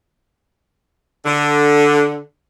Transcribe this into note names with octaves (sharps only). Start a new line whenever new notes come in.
D3